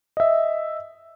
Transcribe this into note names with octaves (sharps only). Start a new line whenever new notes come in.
D#5 E5